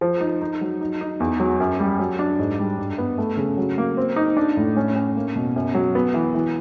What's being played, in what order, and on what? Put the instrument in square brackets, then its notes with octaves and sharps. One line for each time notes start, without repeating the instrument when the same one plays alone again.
[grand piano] F3
D#4
D#4
F#3
D#4
D#4
E2
F#3
F#2
G3
F#3
D4
G#2
G3
G2
B3
A3
C#3
F#3
A#3
C4
D#4
D4
A2
C#4
C#4
A#3
B2
F#2
F#3
B3
E3
E3